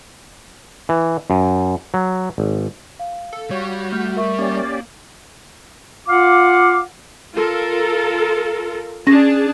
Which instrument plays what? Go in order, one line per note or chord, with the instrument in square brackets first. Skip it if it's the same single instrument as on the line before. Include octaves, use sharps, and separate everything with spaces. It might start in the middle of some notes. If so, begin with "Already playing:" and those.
[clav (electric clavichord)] E3
F#2
F#3
G#1
[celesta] F5
[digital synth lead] A4
[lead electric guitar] G3 [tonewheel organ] F#4 [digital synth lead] C#5
[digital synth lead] A3 [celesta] F6 G6
[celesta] A#4 E5 C#6
[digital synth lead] A#3 [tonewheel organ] C#4 G4 D5
[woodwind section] F4 F5 F#5 D6
[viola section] F4 A4 A#4
[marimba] C#4 A#6 [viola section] D4 G#4 A5